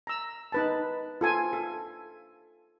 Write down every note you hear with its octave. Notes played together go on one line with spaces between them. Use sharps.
A#5 E6
D#4 B4 A5
F4 A4 G#5
A4